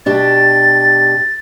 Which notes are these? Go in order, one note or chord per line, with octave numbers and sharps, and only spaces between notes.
B2 D4 G4 A6